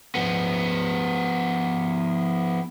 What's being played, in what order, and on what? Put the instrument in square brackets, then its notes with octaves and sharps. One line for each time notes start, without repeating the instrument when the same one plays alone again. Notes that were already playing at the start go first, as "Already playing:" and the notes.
[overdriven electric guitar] F3 B3